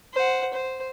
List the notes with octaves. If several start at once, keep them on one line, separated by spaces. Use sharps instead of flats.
C5 F#5
C5